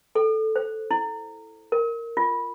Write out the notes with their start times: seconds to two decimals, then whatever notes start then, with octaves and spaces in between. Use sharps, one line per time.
0.15 A4
0.56 C5
0.91 E4
1.72 A#4
2.17 F4